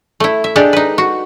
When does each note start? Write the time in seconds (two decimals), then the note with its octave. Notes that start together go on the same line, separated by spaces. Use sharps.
0.20 A3 E4
0.44 E5
0.56 G#3 D4 G4 A4
0.73 D#4 B4
0.98 F#4